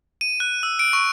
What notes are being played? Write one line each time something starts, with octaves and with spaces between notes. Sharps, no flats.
D#7
F#6
E6
D7
C#6